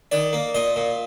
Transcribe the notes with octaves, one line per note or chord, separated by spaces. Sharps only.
D#3 D5
A#3
A#2 D#5
A#2